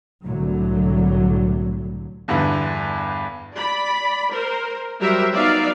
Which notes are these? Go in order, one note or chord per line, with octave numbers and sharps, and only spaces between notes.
C2 A2 D3 F#3
E2 G2 D3 E3
D5 B5
A#4 C5
F#3 G3 G4 A#4 C5 E5
F#3 B3 D#4 D5 E5 F5